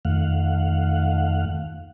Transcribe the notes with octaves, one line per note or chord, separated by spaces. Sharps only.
F2 D#3 A3 F5 F#5